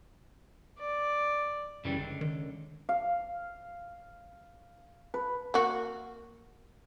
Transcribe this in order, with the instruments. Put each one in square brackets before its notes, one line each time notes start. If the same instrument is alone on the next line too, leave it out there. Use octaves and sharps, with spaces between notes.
[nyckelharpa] D5
[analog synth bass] F#2 [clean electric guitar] C#3 E3 G3
[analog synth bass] G#1 [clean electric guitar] C#2 D3
[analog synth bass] D#3
[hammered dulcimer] F5
B4
[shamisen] A#3 F#4